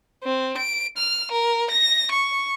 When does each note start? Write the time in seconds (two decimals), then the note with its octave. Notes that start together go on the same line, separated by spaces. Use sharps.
0.23 C4
0.57 D7
0.97 F6
1.31 A#4
1.70 A#6
2.11 C#6